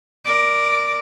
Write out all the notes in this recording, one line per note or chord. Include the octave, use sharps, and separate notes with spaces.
A#4 D5